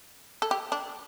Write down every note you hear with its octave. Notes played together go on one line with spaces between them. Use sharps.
A4
G4
D4